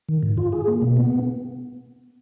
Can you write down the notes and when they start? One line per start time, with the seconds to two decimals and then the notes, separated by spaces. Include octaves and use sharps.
0.09 D#3
0.23 G#2
0.38 F4
0.52 G#4
0.68 A#3
0.82 B2
0.97 B3